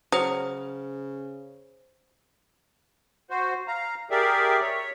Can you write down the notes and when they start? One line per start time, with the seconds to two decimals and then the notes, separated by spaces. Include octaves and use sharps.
0.12 C#3 F#3 C5 D#6
3.30 F#4 C5
3.68 F5 A#5
4.10 G4 G#4 A#4 D5 E5
4.60 C#5 E5